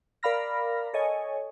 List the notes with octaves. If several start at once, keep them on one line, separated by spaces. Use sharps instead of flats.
A#4 D5 F5 B5 F6 A#6
A4 C#5 D#5 G#5